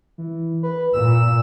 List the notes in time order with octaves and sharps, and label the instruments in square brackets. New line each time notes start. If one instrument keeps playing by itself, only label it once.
[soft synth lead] E3
B4
[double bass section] A#2 [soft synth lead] E6